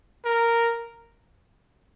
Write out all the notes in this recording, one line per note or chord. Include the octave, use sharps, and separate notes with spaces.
A#4